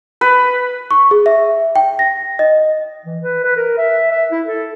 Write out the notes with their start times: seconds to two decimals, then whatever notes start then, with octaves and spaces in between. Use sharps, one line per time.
0.21 B4
0.91 C#6
1.11 G#4
1.26 E5
1.76 G5
1.99 A#6
2.39 D#5
3.05 E3
3.22 B4
3.44 B4
3.56 A#4
3.78 E5
4.11 E5
4.31 E4
4.46 A4